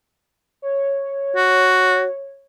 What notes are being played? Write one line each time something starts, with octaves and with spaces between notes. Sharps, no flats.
C#5
F#4